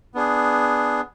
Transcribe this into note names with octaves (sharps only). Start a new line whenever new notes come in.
B3 D4 G#4